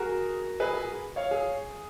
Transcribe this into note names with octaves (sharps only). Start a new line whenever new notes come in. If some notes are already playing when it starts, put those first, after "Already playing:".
Already playing: F#4 G#4 A#4
G#4 B4
G#4
C#5 F5
G#4